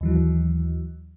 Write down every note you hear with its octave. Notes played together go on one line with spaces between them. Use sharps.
D#2 E3 F#3